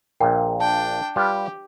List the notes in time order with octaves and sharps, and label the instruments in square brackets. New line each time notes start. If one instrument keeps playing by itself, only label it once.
[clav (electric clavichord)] A#1 A#2 [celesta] A#4 G5
[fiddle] D4 G5 [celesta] A5
[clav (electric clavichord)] G3 F4 B4 [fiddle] G4